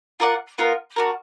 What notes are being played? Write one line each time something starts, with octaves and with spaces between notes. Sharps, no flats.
F4 A#4 D5 F#5
B3 F4 A#4
D4 F#4 A#4